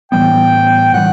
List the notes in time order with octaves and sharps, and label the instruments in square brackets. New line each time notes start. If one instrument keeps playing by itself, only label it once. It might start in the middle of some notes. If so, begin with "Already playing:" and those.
[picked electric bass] A2 E3 G3 B3 [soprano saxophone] G5
[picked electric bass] A2 E3 G3 [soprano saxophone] F#5